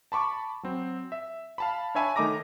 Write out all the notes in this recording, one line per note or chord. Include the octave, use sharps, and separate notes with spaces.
A5 B5 C#6 D6
F#3 C4
E5
F5 A5 B5
D4 C#5 E5 G#5 A5 B5
D#3 A3 D#5 A#5 D6 A#6